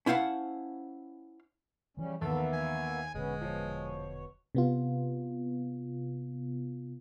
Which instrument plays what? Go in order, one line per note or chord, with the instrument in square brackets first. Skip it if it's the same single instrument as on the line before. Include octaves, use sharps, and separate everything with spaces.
[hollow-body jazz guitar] C#4 E4 C5 F5 F#5 A5
[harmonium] C#3 G3 C#4 [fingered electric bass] E3 F3
[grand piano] D#2 [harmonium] A#3 B3 E5 [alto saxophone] A4
[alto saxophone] G#5
[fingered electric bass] E1 A#2 D3 [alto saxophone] G#3 [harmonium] B3 C#4
[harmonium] B2 C#5 [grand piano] F3
[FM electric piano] C3 B3 F4